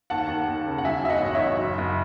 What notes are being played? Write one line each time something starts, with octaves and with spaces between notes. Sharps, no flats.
D#2 F#5 A5
D#2
D#2
C#3
F#5
F#3 E5 G#5
F#3 E5
D#5 F#5
A1
C#5 E5
F#3
F#1
F#1